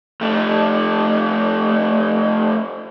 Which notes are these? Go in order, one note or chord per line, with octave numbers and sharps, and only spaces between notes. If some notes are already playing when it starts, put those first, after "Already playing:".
F2 A3